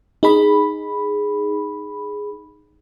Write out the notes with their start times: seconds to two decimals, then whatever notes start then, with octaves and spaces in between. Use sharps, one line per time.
0.23 D#4 G#4 B5